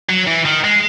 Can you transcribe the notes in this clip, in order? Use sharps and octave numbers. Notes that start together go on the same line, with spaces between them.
F#3
E3
D#3
G#3